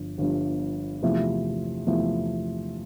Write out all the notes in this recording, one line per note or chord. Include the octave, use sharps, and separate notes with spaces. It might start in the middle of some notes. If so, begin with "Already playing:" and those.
Already playing: G1 G2 F3
G1 G2 F3
E2 C3 F3 A3 E4
E2 C3 F3 A3 E4